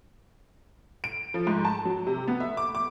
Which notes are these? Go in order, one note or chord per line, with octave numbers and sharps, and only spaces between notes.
D7
F3
G#2
A5
F#3
C3
B3
E5
D6
D6